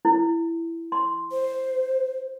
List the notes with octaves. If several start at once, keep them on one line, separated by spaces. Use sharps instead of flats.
E4
C6
C5